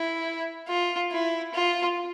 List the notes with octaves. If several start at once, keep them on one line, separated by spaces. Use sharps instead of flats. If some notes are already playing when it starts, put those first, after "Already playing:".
Already playing: E4
F4
E4
F4